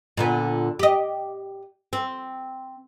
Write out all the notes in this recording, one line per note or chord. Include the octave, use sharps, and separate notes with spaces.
A#2 D3 B3
G4 D#5
C4